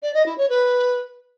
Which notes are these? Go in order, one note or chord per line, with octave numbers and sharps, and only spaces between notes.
D5
D#5
E4
C#5
B4